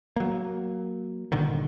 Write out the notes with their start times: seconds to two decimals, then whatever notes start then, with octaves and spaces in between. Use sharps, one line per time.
0.16 F#3 A#3
1.32 G1 A#2 D3 D#3